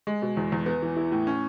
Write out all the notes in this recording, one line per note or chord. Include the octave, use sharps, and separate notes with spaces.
G#3
B2
E2
E2
B3
E3
E4
A2
C#4